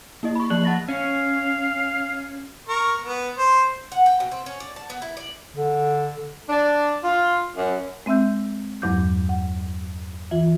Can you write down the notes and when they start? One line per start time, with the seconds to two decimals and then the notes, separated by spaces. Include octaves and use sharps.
0.23 A#3 E4 D#5
0.35 B5 C#6
0.50 F3 A#3 D5 F#6 F#7
0.65 F#5 A5 A6 A#6
0.88 C#4 F5
2.69 A#4 C#6
3.01 B3
3.38 C5
3.92 F#5
4.06 G5
4.20 B2
4.31 C4
4.46 C#4
4.60 D5
4.76 A5
4.90 B3
5.02 E4
5.17 D5
5.56 D3
6.49 D4
7.04 F4
7.57 F#2
8.06 G#3 C4 E5 E6 G6
8.82 E2 G2 F#3 D6 G6
9.29 F#5
10.31 E3 F4